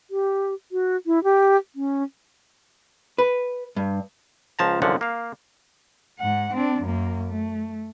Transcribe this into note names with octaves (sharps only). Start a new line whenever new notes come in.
G4
F#4
E4
G4
C#4
B4
G2
C#2 F3 A5 A#5
C2 F#2 D3 F3 F#5
A#3 F5
G#2 F#5
C4 D4
F#2 A#3
A3